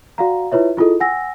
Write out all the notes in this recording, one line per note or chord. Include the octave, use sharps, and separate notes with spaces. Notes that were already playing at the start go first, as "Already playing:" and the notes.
F#4 D5 F5 F#5 A#5
E4 F4 B4 C#5 E5
E4 F4 G#4 A4 D#5
F#5 G#5 E6 A#6